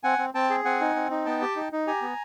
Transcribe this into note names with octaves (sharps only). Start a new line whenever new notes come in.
C4 F#5 G#5
C4
C4 G5 A5
G#4
C4 F#5 G#5
D#4
C4
D#4
B3 G5 A5
G4
D#4
D#4
G4 G#5 A#5
B3